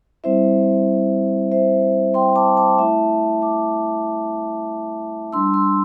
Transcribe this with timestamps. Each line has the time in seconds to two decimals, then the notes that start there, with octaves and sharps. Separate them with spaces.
0.24 G3 C4 E4 C5 E5
1.51 C5 E5
2.14 G5 C6
2.36 A5 D6
2.57 A5 D6
2.78 A3 E4 E5 A5
3.42 A5 D6
5.33 G3 D4 C6 E6
5.54 C6 E6